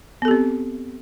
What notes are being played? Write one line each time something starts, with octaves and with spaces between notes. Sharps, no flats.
B3 C4 G4 A4